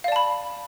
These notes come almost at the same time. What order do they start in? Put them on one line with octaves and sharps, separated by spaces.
F5 D5 A5 B5